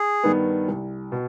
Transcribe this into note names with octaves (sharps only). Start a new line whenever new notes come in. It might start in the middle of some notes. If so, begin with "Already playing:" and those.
Already playing: G#4
G2 D#3 B3
C2
B2